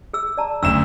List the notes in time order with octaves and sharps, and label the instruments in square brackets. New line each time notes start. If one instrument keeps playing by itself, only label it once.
[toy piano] G#4 E6
D5 A5 A#5
[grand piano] F#1 D2 E7 [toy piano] E6